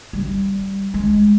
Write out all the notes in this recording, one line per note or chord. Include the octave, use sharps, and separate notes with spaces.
G3
G#3